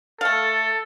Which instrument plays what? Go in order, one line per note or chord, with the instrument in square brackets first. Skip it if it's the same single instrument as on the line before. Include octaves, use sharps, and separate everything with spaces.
[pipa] A3 F5 [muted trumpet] A4